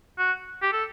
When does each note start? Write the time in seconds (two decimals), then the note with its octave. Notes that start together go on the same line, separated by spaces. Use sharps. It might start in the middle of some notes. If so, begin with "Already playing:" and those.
0.18 F#4
0.62 G4
0.73 A4